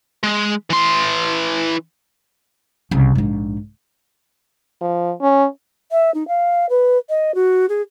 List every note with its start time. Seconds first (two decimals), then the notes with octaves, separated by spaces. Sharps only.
0.23 G#3
0.70 E3 C6
2.91 C2 C#3
3.15 A#1 G#2
4.81 F3
5.21 C#4
5.91 E5
6.14 D#4
6.28 F5
6.70 B4
7.09 D#5
7.35 F#4
7.69 G#4